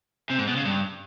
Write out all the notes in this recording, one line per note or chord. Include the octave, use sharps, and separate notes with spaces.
C3
G#2
B2
C#3
G2